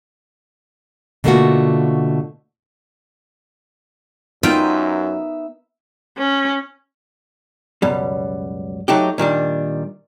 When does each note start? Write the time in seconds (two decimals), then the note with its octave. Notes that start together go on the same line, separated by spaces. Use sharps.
1.24 B2 D3 A3 A#3 F4 F#4
4.43 F#2 B3 D#4 F4 A#4 E5 G5
6.18 C#4
7.82 C#2 F#2 B2 G3
8.88 F#3 A3 D#4 G4
9.18 A#2 D#3 G3 D4